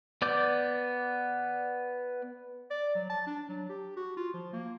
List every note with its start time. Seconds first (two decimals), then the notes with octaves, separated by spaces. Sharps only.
0.22 B3 D5 D6 G6
2.71 D5
2.95 F#3
3.09 A5
3.26 D4
3.49 F#3
3.69 G4
3.97 F#4
4.17 F4
4.34 F3
4.53 A#3